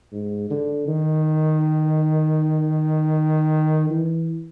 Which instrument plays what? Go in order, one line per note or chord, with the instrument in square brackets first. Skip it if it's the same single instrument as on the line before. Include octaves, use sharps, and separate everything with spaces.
[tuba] G#2
D3
D#3
E3